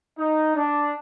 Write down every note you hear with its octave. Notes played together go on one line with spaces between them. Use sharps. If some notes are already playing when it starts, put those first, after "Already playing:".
D#4
D4